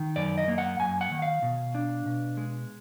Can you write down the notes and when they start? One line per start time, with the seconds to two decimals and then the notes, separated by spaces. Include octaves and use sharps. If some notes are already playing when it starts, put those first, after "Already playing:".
Already playing: D#3
0.16 F#2 D5
0.38 D#5
0.48 A#3
0.58 F#5
0.80 F#2 G#5
1.01 F#5
1.11 D#3
1.22 F5
1.42 B2
1.75 D4
2.06 B2
2.37 G#3